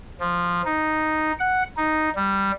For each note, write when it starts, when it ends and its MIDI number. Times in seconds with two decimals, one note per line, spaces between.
0.20 0.62 53
0.65 1.31 63
1.39 1.63 78
1.77 2.09 63
2.16 2.51 55